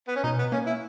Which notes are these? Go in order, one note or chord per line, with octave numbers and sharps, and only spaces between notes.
B3
C#4
B2 D#4
B3
A#3 C#4
E4